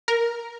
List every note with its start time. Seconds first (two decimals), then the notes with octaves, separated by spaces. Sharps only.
0.08 A#4